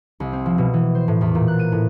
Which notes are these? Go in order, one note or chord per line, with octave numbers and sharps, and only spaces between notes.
C2
C4
F3
B2
E3
C5
A2
E2
A#2
F#6
D#7
A2